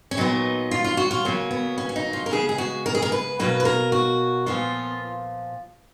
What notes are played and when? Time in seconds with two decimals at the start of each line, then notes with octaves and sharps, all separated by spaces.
0.11 C#4
0.17 A#2 F#3 B3 D#4
0.71 F4
0.84 F4
0.97 F#4
1.11 F4
1.25 C#3 F#3 A#3 C#4
1.51 B3
1.78 C#4
1.89 C#4
1.96 D#4
2.13 F4
2.26 A#4
2.31 C#3 G#3 B3 G#4
2.49 G#4
2.58 F#4
2.86 A#4
2.95 G#4
3.02 A#4
3.12 B4
3.39 B2 F#3 A#3 B4
3.60 B4
3.65 A#4
3.92 F#4
4.46 A#2 F3 B3 F4